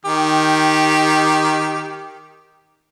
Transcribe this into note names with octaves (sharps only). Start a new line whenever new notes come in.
D#3 G4